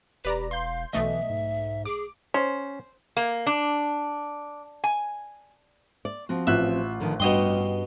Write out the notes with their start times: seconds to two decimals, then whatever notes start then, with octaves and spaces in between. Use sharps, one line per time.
0.25 E1 G4 B4 D5 A#5
0.51 F5 C6 G6
0.93 B1 E3 A3 D#5 E5
1.30 G#2
1.85 G#4 D6
2.34 C#4 C5
3.17 A#3
3.46 D4
4.84 G#5
6.05 D5
6.29 F3 C4 F#4
6.47 A1 F4 E5 F#6
7.00 D3 D#3 F3
7.20 G2 B2 D#5 F#5 G5 C6